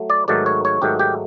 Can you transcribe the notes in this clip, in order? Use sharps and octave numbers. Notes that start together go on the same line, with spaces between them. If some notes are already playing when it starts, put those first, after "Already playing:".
Already playing: F#3 A3
D5
G#2 D#3 F#3 A3 D5
C#5
C#5
G#2 D#3 F#3 A3 G4
G4